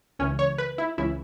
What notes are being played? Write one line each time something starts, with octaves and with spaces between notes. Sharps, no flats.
C#2 C#3 E3 C#4
C#5
B4
E4
C#2 C#3 E3 E4